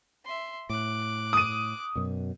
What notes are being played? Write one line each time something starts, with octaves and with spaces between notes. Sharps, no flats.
E5 C6
A2 D6 F#6
D#6 D#7
F#2 B2